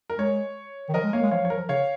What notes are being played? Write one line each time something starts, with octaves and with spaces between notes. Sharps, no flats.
A#4
G#3 C#5
D#3
F3 A#4 D#5
G#3
A#3 C#5 F5
G#3
F3 C#5 F5
F3 C#5
A#4
F3
C#3 C#5 F5